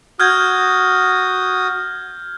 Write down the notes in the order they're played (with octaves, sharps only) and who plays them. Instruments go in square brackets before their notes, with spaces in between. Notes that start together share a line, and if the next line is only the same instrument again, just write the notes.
[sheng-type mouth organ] F#4 D#6 [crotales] F6 G6 G#6